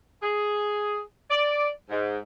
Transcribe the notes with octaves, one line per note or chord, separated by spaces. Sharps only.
G#4
D5
G#2